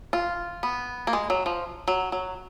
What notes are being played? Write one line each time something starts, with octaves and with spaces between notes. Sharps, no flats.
F4
B3
A#3
G#3
F#3
F3
F#3
F#3